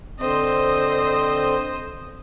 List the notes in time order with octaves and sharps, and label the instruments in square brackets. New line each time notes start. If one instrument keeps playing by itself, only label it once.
[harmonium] D3 C4 [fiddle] C5 D#5